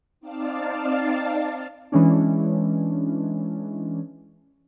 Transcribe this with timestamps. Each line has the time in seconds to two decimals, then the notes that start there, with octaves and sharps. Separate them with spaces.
0.20 C4 D#4 D5 F5 A5
1.92 E3 G#3 C#4 D4